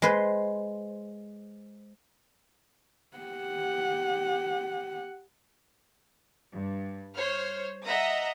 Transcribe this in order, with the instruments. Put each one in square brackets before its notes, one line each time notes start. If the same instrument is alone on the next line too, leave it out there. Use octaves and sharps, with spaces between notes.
[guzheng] G#3 B4 C5
[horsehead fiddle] G4 F#5
[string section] G2
C5 C#5 F6
D#5 E5 F#5 A#5 D#6